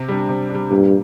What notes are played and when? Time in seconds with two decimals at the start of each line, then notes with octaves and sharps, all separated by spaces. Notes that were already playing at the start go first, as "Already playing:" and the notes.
Already playing: C3
0.08 G3 D4
0.29 C3
0.50 D4
0.55 G3
0.71 G2 A#2